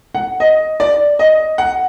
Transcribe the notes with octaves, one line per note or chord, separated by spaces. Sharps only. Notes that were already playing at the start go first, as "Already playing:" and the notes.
F#5
D#5
D5
D#5
F#5